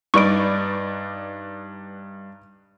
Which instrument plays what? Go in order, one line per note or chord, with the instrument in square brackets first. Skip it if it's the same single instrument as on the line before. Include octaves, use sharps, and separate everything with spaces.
[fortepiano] G2 [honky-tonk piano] D#4 B4 D5 [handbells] C#6 D7